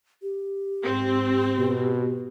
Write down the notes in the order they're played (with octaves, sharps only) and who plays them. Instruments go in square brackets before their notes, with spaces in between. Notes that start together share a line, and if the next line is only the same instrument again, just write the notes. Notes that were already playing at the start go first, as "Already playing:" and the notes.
[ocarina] G4
[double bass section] G#2 [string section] C4
[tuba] B2